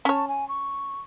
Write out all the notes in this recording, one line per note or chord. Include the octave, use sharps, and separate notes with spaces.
C#4 C#5 A5
G#5
C#6